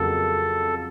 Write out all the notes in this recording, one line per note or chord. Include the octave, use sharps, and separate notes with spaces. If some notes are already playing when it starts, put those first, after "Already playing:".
Already playing: F2 C#3 F#3 A#3 A4